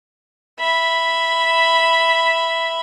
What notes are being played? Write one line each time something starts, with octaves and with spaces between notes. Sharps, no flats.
E5 B5